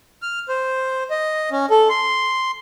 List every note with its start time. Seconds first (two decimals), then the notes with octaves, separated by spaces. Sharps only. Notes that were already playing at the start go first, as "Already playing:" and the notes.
0.22 F6
0.49 C5
1.10 D#5
1.52 C#4
1.70 A4
1.90 C6